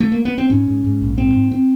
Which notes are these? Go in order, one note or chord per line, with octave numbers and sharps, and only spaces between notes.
A3
A#3
B3
C4
G#2 C#4
G#2
G#2
A#1
G#2 C4
G#2
C4